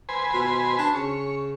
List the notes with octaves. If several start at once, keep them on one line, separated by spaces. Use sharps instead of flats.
B4 C5 G#5
B2
D4
C#3 C#5